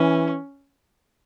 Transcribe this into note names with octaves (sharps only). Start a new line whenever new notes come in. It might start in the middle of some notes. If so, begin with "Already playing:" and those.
Already playing: E3 C#4